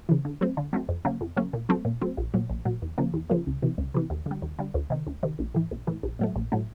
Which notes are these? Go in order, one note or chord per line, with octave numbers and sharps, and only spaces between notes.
C#3 E3
D3
F#3 A3 C4
D3
F#3 A3 C4
F2
C#3 F#3 A#3 C#4
F2
C#3 F#3 A#3 C#4
A#2
F#3 A3 C4
A#2
F#3 A3 C4
A#1
A#2 F#3
A#1
A#2 F#3
E2
C#3 F3 A#3
E2
C#3 F3 A#3
C#2
C3 E3
C#2
C3 E3
D#2
D3 G3
D#2
D3 G3
D2
C3 D#3
D2
C3 D#3
A#1
A2 E3
A#1
A2 E3
A#1
A2 F#3 A3
A#1
A2 F#3 A3